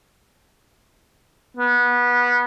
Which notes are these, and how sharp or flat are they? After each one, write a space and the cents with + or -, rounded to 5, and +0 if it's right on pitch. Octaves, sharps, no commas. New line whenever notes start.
B3 -20